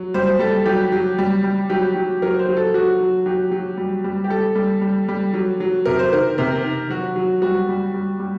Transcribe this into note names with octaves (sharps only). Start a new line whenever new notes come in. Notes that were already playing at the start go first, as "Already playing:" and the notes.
Already playing: F#3
G3 C5
G3 A4
F#3 G4
F#3
G3
G3
F#3 G4
F#3
F#3 A#4
C5
F#3
A4
F#3 F#4
F#3
F#3 G4
F#3
G3
G3
G4
G3 A4
G3
G3
G3
F#3
F#3
C3 A#4
C5
D#3 A#4
C3 A#4
D#3
F#3 F#4
F#3
G3 F#4
G3
G3
G3